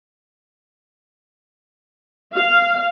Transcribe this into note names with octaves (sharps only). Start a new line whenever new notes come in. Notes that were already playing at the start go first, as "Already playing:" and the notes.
F5